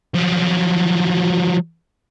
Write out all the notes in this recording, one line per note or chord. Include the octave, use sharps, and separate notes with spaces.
F3 F#3